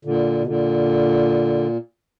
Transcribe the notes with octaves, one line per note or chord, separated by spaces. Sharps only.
A#2 D3
B2
A#2 D3